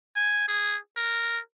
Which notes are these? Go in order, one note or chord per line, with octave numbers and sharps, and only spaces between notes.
G#5
G#4
A#4